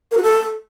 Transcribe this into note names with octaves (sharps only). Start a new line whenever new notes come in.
A#4
F#4
A4